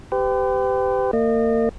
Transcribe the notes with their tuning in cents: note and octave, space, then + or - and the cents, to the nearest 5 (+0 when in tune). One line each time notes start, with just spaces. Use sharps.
G4 +0 B4 +45
A#3 -35 D#5 -35